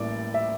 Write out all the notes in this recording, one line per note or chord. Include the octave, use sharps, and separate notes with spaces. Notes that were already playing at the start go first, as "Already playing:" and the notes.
Already playing: A1 A2 G3 A#3 D5
E5